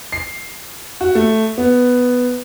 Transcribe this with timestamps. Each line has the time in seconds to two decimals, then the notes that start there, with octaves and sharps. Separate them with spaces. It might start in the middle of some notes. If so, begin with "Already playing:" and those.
0.12 C7
1.01 F#4
1.15 A3
1.58 B3